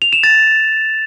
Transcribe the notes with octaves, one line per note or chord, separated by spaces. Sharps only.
F7
E7
A6